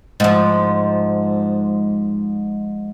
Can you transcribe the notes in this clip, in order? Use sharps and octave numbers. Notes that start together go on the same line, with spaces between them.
G#2 F3